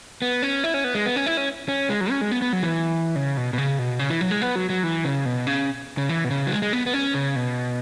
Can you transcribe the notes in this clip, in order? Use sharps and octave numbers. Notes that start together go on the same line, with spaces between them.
B3
C#4
E4
C#4
B3
G#3
B3
C#4
E4
C#4
C#4
G#3
F#3
C#4
G#3
B3
B3
F#3
E3
C#3
B2
B2
C#3
B2
C#3
E3
F#3
G#3
B3
F#3
F#3
E3
C#3
B2
C#3
C#3
E3
B2
C#3
F#3
G#3
G#3
B3
B3
C#4
C#3
B2